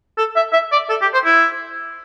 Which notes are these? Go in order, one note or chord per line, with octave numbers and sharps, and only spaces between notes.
A4
E5
E5
D5
A4
G4
C5
E4